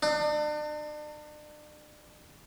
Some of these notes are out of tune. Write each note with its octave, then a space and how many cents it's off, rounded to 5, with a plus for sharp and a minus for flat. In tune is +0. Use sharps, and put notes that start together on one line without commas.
D4 +40